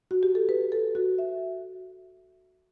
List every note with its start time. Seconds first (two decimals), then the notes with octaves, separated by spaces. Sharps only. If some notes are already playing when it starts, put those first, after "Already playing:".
0.11 F#4
0.23 G4
0.35 A4
0.49 B4
0.72 A4
0.95 F#4
1.18 E5